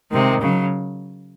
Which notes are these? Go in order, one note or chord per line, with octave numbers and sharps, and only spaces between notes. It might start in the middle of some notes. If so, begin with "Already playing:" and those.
C3 D#3 G#3
C#3 F#3